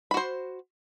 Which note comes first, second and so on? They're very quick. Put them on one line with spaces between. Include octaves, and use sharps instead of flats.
B5 F#4 C5